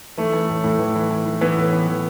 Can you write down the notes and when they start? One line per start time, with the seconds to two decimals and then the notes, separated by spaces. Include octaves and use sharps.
0.18 E3 A3
0.33 E3
0.49 A2
0.64 A2
0.79 E3
0.96 E3
1.11 E3
1.25 E3
1.41 E3 B3
1.57 A2
1.73 E3
1.87 E3